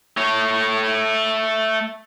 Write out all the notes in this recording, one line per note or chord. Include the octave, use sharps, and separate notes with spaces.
A3 C#5